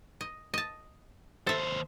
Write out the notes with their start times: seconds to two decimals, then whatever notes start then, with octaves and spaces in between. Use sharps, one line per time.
0.21 D#5
0.54 D#5 A5
1.47 D#2 A4 C5 E5